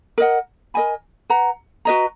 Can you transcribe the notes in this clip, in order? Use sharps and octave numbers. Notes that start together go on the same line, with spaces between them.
A#4 D#5 F#5
A#4 D#5 G#5 B5
B4 F#5 A#5
F#4 B4 D#5 A#5